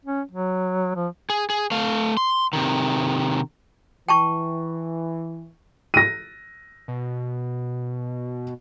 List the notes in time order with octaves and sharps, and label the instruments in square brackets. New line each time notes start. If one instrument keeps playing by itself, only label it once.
[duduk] C#4
F#3
F3
[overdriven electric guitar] G#4
G#4
A3 F5
C6
C3 D#3
[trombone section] E3 [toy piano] G5 A5 C#6
[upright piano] A#6 D#7
[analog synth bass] B2